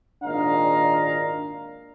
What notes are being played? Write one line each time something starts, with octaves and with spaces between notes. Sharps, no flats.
G#1 A#2 D4 D#5 F5 A#5